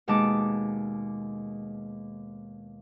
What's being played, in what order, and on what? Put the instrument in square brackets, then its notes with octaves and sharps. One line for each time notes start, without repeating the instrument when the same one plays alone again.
[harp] D#2 B2 G#3 D#4 A5 D6